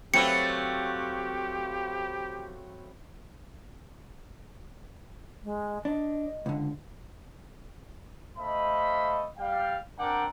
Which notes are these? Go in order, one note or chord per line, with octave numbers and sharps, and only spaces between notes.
F#3 A3 C4 F#4 G4 B4 F5 C#7
G#3
D4 D#5
C#2 D3
A3 C5 D#5 F5 B5
G3 F5 G5
C4 D4 A#4 F#5 G5 D6